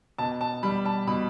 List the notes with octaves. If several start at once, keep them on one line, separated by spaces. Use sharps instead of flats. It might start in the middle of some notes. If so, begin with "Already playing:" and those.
B2 A5
A5
G3 B5
A5
B2 B5